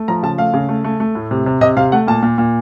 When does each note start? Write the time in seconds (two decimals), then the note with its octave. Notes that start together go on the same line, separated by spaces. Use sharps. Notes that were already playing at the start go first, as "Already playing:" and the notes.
Already playing: A3
0.08 F3 A#5
0.23 C#3 A5
0.38 A3 F5
0.54 C#3
0.69 A3
0.84 A3
1.00 A3
1.15 A2
1.31 C3
1.46 C3
1.61 C3 D#5
1.77 C3 F5
1.92 A3 F#5
2.07 A#2 A5
2.23 A#2
2.38 A#2